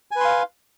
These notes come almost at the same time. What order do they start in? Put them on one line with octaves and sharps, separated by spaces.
G#5 B4 C6 F5